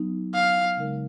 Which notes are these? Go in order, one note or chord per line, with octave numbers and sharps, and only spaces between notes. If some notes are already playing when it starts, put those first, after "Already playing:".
Already playing: F#3 B3 D#4
F5
C#3 G#3 D#4 A#4